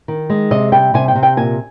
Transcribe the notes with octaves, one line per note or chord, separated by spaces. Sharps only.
D#3
G#3
C3 D#5
G3 G5
C3 G#5
G5
C3
G5
A#2 G#5